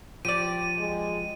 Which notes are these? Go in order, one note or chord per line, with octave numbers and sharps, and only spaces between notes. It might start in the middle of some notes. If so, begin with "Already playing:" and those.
F3 G4 D5 D#7
G#3